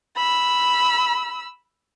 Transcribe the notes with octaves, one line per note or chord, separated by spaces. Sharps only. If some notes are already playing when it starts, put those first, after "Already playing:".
B5 E6